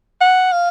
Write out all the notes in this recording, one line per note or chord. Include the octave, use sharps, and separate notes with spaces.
F#5
F5